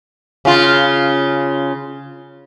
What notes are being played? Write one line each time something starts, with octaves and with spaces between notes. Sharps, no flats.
C#3 F4